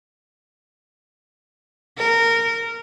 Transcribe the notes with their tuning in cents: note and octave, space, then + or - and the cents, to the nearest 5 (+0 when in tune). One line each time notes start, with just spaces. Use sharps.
A#4 -15